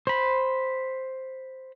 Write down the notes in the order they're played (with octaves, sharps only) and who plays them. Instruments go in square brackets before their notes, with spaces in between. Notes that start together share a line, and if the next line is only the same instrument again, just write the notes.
[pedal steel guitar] C5 B5